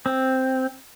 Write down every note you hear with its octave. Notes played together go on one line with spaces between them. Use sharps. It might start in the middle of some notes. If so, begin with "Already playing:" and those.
C4